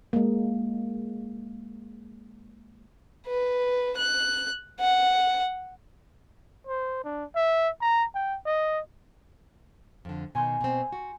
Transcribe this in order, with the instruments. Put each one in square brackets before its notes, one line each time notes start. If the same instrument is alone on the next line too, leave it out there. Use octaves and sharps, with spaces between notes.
[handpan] G#3 A#3
[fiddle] B4
F#6
F#5
[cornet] C5
D4
E5
A#5
G5
D#5
[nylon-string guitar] F2 D3
[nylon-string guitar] B2 D#3 [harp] G#5 C6 G6
[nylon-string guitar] B2 C4
F#4